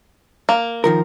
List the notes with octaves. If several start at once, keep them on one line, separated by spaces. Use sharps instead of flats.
A#3
D#3 F3 A#4